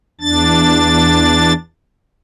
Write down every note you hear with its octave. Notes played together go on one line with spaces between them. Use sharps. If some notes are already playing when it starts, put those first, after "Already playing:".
E2 D4 A6